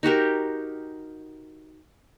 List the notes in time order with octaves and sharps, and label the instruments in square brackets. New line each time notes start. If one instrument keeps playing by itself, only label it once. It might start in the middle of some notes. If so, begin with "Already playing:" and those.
[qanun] D#4 F#4 G4 A#4